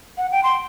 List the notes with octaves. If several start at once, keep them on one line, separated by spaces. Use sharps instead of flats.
F#5
G5
C6